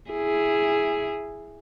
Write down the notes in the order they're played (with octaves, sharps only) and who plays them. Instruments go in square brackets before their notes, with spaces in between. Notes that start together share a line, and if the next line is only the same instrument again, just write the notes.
[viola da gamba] E4 G#4